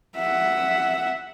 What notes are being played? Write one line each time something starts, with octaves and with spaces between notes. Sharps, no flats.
E5 F#5